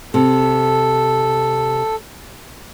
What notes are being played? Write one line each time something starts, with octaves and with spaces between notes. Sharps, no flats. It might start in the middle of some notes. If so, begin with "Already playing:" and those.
C3 A4